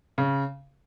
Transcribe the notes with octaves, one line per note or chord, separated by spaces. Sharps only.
C#3